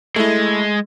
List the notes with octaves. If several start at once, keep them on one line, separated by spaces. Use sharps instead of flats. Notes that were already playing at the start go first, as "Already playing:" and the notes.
G#3 A3 E4